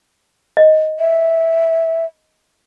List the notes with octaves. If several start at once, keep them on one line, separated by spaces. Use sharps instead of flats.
D#5
E5